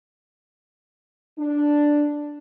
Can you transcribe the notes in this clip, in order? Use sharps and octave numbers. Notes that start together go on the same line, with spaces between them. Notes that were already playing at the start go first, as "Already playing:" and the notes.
D4